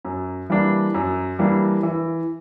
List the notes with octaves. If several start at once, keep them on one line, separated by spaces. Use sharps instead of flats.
F#2
E3 G3 A#3 D4
F#2
E3 G3 A#3 D4
E3